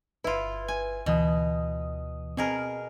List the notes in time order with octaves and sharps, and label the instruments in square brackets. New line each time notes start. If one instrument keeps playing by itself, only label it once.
[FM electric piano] G1 B4 [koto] E4 F4
[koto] G#5
[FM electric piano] D2 E3 D#6 [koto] B2
[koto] B2 G#4 A#4 [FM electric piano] C4 F6